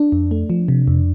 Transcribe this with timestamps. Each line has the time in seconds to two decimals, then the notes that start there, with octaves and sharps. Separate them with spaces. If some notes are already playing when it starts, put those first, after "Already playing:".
Already playing: D4
0.12 F2
0.31 A3
0.50 F3
0.68 C3
0.88 F2